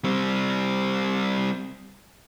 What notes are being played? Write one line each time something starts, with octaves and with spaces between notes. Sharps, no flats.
G3 C4